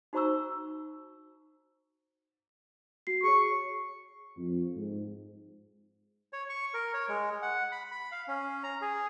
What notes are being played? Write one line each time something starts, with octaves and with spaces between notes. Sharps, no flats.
D#4 F#4 C5 A#5 C#6 E6
F#4 C7
G#4 C#5 C#6
F2
G#2
C#5
C#6
A#4
C#5
G#3
F#5
B5
B5
F5
C#4
A#5
G#4